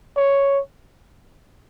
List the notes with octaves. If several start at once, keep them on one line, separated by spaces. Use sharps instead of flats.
C#5